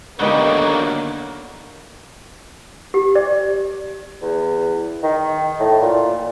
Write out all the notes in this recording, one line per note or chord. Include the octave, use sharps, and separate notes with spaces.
D3 D#3 F#3 A#3 B3 D#4 G4 A#4
G4
D5
E2
D#3
A2
A#2